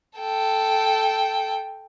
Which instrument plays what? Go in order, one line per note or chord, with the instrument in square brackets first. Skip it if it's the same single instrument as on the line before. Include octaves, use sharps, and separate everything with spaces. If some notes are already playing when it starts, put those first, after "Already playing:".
[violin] A4 G5